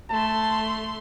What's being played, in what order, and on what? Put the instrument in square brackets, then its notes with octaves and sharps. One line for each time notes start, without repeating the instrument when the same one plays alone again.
[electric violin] A3 C6 [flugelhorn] A5